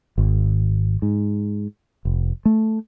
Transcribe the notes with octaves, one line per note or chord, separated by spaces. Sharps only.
G#1
G#2
F1
A3